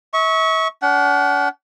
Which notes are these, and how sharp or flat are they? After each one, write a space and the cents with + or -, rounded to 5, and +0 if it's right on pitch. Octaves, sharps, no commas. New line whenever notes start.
E5 -40 C#6 +0
D4 -45 F#5 +25